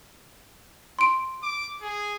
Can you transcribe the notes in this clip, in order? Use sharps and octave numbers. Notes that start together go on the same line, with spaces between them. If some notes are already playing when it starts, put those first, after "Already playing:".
C6 D7
D6
G#4